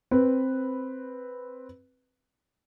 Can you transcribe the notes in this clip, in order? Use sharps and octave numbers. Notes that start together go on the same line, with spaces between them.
C4 B4